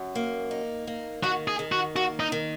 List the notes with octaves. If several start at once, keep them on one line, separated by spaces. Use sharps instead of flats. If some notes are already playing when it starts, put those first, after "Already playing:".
Already playing: F#2
A#3
D#4
A#3
D#3 F#4
G#4
D#3
F#4
A#3 F#4
D#4
D#3